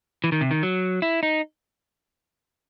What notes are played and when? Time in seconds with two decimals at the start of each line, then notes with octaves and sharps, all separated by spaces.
0.24 E3
0.32 D#3
0.41 C3
0.51 D#3
0.63 F#3
1.02 E4
1.23 D#4